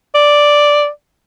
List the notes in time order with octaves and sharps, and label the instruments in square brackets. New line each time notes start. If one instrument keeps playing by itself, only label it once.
[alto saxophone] D5